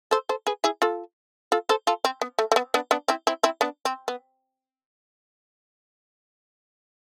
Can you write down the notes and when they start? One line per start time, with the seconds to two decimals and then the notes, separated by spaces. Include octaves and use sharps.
0.11 A4 C5
0.29 A4 C5
0.47 G#4 B4
0.64 E4 G#4
0.82 F4 A4
1.52 F4 A4
1.69 A4 C5
1.87 F4 A4
2.05 C4
2.22 B3
2.39 A3
2.52 A3
2.56 B3
2.74 B3 D4
2.91 B3 D4
3.08 C4 E4
3.27 C4 E4
3.43 C4 E4
3.61 B3 D4
3.85 C4
4.08 B3